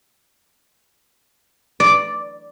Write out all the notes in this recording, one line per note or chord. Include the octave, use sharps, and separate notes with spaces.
D5